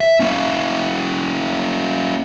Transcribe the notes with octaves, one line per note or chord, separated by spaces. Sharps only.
E5
A#3 C#4